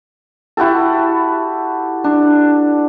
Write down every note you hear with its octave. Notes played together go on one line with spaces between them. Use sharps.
E4 F#4 G4 A4
D4